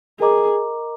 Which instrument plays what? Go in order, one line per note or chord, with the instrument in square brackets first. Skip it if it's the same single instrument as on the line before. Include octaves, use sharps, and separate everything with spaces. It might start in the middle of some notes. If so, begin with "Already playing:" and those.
[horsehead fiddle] G#4 [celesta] A#4 D#5 A#5 D6